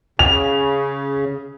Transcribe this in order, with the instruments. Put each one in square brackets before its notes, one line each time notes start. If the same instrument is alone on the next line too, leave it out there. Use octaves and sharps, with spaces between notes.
[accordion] C#3 [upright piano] F7